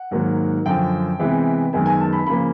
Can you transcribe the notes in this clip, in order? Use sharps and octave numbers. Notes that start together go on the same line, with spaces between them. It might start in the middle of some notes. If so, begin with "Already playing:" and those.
Already playing: F#5
G#2 D#3 F#3 A#3
F#2 D3 F3 G5
C3 E3 G#3 B3
F#2 D#3 G#3 B3 G#5
G#5
A5
B5
C#3 F3 A#3 B5